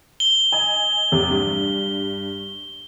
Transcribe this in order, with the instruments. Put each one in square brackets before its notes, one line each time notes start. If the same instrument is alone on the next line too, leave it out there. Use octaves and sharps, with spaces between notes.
[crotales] G7
[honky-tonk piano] D#5 G#5
E2 C3 E3
G2